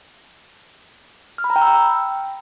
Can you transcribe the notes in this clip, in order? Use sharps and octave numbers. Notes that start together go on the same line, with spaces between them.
F6
B5
A#5
G5
E6